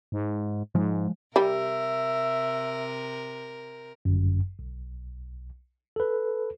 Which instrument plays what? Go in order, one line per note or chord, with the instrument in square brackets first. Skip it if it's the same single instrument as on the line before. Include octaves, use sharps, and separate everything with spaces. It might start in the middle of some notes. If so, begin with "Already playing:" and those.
[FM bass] G#2
[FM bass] G#2 [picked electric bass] F3 G#3
[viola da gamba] C3 A#4 [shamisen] G3 [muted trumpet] E5
[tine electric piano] G1 F#2
B1
A4 B4